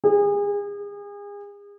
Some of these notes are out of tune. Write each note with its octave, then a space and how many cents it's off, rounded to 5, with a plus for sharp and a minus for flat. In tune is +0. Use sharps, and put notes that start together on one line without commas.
G#4 -35